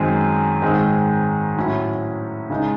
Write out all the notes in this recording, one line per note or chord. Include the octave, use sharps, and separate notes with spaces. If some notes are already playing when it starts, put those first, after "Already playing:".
Already playing: F#2 D#3 G#3 C4
G#2 D#3 G#3 C4
A2 F#3 C#4 E4
C#3 G#3 D#4